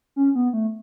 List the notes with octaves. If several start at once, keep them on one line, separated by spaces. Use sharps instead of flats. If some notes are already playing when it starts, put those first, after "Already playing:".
C#4
B3
A3